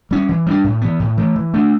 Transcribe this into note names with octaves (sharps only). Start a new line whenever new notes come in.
G3 C#4
E3
G3 B3 D4
A2
E3 B3
A2
E3 A3
E3
A3 D4